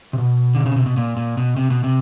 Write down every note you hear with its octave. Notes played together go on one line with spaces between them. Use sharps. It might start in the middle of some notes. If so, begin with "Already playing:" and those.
C3
B2
D3
C#3
C3
B2
A#2
A#2
B2
C3
B2
C3